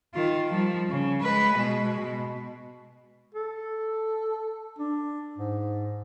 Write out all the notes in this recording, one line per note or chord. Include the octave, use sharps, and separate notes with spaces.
D#3 F4
F3 G3
C#3
G#3 B4
B2 G#3
B2
A4
D4
G#2